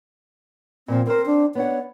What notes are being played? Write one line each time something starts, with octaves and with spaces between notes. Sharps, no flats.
A#2 F3 C4
C4 A#4 C5
D4
B3 D4 C#5 F#5